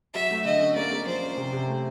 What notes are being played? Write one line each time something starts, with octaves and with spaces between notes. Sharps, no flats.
F#3 E5
A3
D3 D#5
C#4
A#3 D5
A#3
F3 C5
C#4
C3
C3
A3